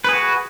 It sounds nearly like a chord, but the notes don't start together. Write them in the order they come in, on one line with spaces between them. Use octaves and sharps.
B4 G#4 F#4